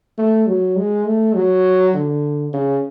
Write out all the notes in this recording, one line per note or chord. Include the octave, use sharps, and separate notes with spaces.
A3
F#3
G#3
A3
F#3
D3
C#3